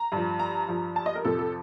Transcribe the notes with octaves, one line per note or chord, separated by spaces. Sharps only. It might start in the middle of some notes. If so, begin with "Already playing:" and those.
Already playing: A#5
G2 F3
A#5
G2 F3
A5
D#5
A#4
F2 C3 F3 A4
A4